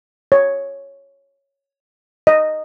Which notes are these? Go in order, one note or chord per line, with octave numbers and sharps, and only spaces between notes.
C#5
D#5